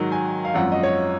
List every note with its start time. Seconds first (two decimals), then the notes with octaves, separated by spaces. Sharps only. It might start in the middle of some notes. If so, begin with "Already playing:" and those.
Already playing: G#2 D#3 F#3
0.12 G#5
0.45 F5
0.54 G#1 F#2 F3 F#5
0.72 D#5
0.83 C#5